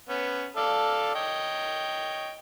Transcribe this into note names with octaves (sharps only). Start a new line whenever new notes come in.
B3 C#4
A4 D5 F5
C#5 D#5 G5